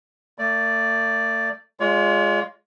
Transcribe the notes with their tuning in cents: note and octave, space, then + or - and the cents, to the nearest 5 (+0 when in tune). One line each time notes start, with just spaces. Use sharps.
A3 +40 D5 +0
G#3 +0 F4 +0 C#5 +45